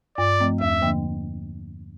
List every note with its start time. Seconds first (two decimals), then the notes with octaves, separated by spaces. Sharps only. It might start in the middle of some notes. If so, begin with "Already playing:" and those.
0.18 G2 D5
0.40 F3 A3 C4
0.60 E2 E5
0.82 D3 F3 A#3 D4